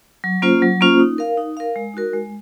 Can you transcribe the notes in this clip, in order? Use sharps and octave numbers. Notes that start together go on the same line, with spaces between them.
F#3
A#3 C#4 F4 C5
F#3
A#3 C#4 F4 C5
D#4
A#4 F5
D#4
A#4 F5
G#3
D#4 F#4 A#4
G#3